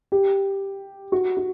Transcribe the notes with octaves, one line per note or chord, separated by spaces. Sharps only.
G4
F#4
F#4